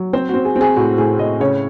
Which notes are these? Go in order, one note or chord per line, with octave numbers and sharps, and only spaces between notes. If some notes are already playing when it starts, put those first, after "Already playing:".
Already playing: F#3
C4 C5
C4 F#4
G#4
C4
G#4
A2 F#4
A2 G#4
A2 D#5
C#3 C#5